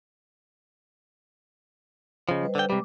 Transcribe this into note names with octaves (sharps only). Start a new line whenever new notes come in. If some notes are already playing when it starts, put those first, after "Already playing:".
C#3 F3 D#5
G3 B4 C5
D3 G5
C3 G3 G#3 D6